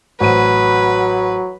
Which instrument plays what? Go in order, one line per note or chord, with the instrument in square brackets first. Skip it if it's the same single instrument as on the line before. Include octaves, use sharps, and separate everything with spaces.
[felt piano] A1 C5 D#7 [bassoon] F#3 [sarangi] B4